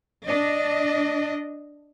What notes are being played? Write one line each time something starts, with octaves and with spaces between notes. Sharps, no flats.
D4 D#5